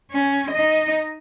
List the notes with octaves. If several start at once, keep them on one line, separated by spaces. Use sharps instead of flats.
C#4
D#4 D#5